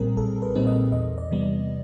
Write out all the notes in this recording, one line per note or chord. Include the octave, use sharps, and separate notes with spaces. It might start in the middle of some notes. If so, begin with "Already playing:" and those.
Already playing: B1 A#2 G3 C4 G#4 A#4
B1 A4
B4
A#2 G3 C4 D#4
D#5
E2 D#5
D5
C3 E3 G3 B3